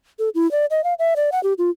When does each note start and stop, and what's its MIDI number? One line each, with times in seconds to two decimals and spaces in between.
0.19 0.29 69
0.35 0.50 64
0.51 0.66 74
0.71 0.83 75
0.84 0.94 77
0.99 1.14 76
1.16 1.30 74
1.32 1.42 78
1.43 1.53 67
1.58 1.70 65